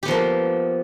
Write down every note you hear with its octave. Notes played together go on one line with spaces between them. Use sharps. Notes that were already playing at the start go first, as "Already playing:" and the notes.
F3 A#3 B3 G4